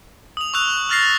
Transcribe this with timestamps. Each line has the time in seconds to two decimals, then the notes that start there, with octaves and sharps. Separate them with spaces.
0.37 D#6 F7
0.54 C#6 E6 F#6 F7
0.89 D#6 F6 A6 A#6 C7